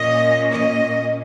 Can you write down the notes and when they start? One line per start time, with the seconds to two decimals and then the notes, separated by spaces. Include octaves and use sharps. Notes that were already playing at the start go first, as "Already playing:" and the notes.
Already playing: A#2 A#3 C#4 D#5
0.52 D#5